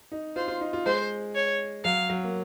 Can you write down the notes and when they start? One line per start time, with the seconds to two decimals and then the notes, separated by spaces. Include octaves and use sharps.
0.12 D#4
0.36 F4 C5
0.48 F4
0.61 D#4
0.73 F4
0.86 G#3 C5
1.35 C#5
1.84 F#3 F5
2.10 F#3
2.24 A#3